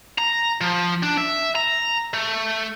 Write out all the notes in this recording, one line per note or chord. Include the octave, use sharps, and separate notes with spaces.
A#5
F3
D4
E5
A#5
A3